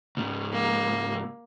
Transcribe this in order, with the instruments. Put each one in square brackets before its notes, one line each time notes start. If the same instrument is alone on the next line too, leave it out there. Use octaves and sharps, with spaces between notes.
[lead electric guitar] C#2 G#2
[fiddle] A#3